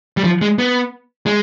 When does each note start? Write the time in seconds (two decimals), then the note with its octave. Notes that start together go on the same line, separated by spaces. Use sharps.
0.17 G3
0.24 F3
0.42 G#3
0.59 B3
1.26 G#3